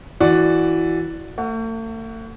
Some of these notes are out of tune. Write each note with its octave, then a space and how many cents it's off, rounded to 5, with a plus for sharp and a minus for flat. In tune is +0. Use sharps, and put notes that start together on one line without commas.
E3 +0 F#4 +0 D5 +0
A3 +40 F#5 +0